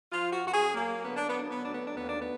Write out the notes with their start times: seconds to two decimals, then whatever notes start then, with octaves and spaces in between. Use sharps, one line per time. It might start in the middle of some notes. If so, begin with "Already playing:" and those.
0.11 F3 F4
0.32 F#4
0.43 F#2 F#4
0.53 G#4
0.73 F#3 A#3
1.03 D3 B3
1.16 D4
1.28 B3
1.34 F#3 D4
1.50 B3
1.63 D2 D4
1.74 B3
1.86 D4
1.96 D#2 B3
2.09 D4
2.21 B3